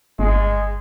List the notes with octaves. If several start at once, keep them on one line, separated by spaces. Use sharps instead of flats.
G1 G#3